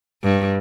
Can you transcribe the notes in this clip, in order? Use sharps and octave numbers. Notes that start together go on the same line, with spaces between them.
G2